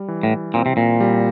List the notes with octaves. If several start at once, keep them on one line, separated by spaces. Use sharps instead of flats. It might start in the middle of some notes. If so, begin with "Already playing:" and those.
Already playing: G3
E3
A2
A#2 C4
C3
A#2
G3